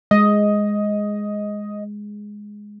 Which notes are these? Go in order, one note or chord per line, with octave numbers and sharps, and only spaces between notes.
G#3 D#5